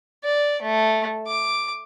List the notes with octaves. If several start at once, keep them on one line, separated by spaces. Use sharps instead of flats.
D5
A3
D6